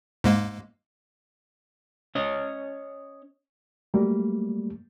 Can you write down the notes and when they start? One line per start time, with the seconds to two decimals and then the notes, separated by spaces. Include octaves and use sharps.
0.24 G#2 G#3 A#3
2.15 C#4 C#5 D#5
3.94 F#3 G3 A3 A#3